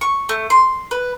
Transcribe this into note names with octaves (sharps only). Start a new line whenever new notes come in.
C#6
A3
C6
B4